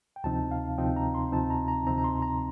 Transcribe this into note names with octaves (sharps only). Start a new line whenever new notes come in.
G5
D2 C3 F3 C4 D#4 A5
F5
D2 C3 F3 C4 D#4 G5
A#5
C6
D2 C3 F3 C4 D#4 A5
A#5
A#5
D2 C3 F3 C4 D#4 A#5
A#5
C6
A#5